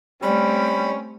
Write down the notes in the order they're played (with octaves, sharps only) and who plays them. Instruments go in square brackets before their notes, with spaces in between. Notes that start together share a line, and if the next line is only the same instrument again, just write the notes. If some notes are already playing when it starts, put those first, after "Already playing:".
[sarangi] G3 [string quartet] A3 C4 [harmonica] C#4 [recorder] B5